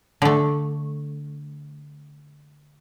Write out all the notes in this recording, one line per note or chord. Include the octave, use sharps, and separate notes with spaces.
D3 A3